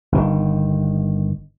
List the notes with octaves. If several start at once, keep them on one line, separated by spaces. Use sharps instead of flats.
G1 D#3